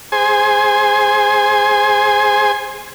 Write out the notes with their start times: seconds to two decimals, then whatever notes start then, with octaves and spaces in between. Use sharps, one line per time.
0.12 G#4 C5 G#5